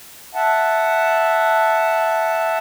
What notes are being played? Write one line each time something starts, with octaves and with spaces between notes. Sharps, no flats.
E5 F#5 A5